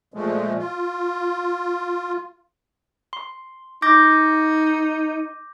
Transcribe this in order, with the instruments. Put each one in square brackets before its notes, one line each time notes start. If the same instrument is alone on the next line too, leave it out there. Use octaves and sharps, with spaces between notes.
[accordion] A#2 F3 G#3 A3
F4
[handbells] C6
[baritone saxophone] D#4 [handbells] D6 G6 A#6